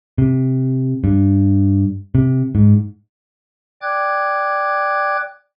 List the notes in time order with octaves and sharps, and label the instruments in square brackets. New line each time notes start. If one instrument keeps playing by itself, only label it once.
[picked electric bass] C3
G2
C3
G#2
[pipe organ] D5 G5 D6 F#6 G#6